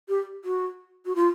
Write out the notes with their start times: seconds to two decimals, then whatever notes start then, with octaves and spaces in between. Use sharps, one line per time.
0.09 G4
0.45 F#4
1.06 F#4
1.16 F4